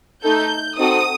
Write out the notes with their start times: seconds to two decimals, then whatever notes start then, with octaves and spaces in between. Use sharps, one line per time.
0.24 A3 D#4 A4 G6
0.77 C4 D#4 F#4 A4 D#6